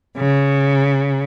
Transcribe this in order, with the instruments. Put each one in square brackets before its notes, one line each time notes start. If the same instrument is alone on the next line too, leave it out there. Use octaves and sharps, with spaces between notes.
[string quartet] C#3